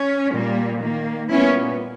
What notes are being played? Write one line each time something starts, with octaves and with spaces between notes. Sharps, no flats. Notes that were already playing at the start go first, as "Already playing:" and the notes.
Already playing: C#4
A#2 G3 A#3
D#3 A#3
A#2 G3 B3 C#4 E4